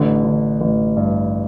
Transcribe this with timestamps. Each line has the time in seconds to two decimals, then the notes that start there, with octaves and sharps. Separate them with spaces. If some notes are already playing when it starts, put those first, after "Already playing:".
Already playing: A1 D3 D4
0.24 D3
0.61 A1
0.97 G2